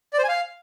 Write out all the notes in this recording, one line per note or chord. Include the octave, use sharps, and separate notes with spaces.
D5
C5
G#5
F5